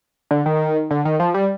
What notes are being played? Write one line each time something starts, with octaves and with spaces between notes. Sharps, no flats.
D3
D#3
D3
D#3
F3
G3